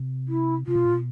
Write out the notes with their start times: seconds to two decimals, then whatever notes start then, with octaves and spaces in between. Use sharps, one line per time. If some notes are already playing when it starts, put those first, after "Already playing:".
Already playing: C3
0.28 E4
0.67 C3 F4
0.76 B2
0.85 A#2
0.93 B2